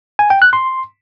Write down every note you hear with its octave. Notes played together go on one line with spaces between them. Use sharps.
G#5
G5
F#6
C6